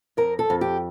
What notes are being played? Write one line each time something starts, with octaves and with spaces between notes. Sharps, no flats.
F2 A#4
A4
F2
G4